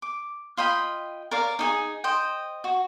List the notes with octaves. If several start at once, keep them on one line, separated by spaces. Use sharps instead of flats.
D6
F4 D#5 G5 B5
A#4 C#5 D5 F5
D#4 G4 G#4
C5 D#5 G5
F#4